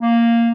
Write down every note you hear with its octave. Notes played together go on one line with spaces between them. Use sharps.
A#3